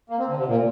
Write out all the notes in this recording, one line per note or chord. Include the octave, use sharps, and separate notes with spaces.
A#3
C4
D3
C3
A#2